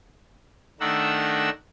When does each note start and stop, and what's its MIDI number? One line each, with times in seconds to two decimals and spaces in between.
0.80 1.50 51
0.80 1.50 57
0.80 1.50 62
0.80 1.50 70
0.80 1.50 78
0.80 1.50 88